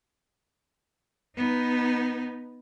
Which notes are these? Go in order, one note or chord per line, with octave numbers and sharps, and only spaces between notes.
B3 D#4